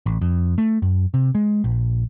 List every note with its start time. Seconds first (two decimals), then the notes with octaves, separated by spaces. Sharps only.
0.06 A1
0.22 F2
0.58 A3
0.82 F#2
1.14 C3
1.35 G#3
1.64 A#1